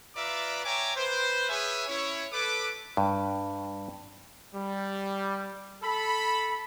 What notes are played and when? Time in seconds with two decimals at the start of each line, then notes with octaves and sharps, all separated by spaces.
0.16 F4 B4 D5 E5 A#5 D6
0.65 C#5 E5 G5 G#5 A#5 D6
0.96 B4 C5
1.49 G#4 B4 C#5 E5 G#5
1.88 C#4 E4 C#5
2.32 A4 B4 D6
2.97 G2
4.55 G3
5.83 A4 B5